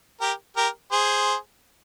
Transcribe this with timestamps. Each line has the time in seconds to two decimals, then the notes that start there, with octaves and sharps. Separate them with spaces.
0.21 G4 A#4
0.56 G4 A#4
0.92 G#4 C5